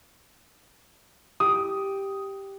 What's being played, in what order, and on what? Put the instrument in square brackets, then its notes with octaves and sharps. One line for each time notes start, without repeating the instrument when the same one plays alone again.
[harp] G4 [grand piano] D#6